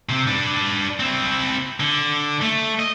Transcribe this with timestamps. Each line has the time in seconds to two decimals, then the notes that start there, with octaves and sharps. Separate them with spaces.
0.09 C3 C4
0.27 D4 B4
1.00 C4 E4
1.80 D3
2.42 A3
2.79 D#5